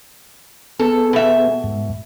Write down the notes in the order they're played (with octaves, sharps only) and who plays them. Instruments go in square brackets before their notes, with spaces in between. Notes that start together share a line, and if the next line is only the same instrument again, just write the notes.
[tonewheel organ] B3 G#4 [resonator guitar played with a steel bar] A4
[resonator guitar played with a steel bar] B2 E5
[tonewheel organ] G#2